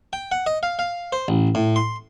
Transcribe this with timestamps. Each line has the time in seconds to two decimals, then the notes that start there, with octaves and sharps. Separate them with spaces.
0.13 G5
0.32 F#5
0.47 D#5
0.63 F5
0.79 F5
1.13 C5
1.28 A1
1.55 A2
1.76 C6